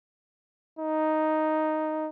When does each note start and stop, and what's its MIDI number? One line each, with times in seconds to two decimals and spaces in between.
0.79 2.09 63